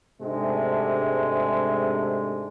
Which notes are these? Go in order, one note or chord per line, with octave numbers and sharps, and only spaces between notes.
G#2 C3 G#3 A3 D4